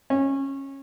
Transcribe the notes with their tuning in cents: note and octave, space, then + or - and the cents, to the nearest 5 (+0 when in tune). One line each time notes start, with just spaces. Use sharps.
C#4 -20